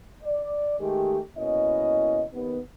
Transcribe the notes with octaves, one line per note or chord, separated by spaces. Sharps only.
D5
D#3 G#3 A3 G4
B2 A#3 C#4 E4 D#5
D#2 B3